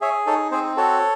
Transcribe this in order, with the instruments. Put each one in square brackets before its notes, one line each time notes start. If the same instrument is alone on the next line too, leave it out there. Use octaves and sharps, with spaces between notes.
[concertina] G#4 C#5 E5
D#4 A4 C#5
C4 G#4 C5
F#4 A4 C#5